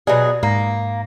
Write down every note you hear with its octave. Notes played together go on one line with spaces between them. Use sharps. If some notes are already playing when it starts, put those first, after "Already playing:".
B2 F#3 G#4 D5
G#2 A#3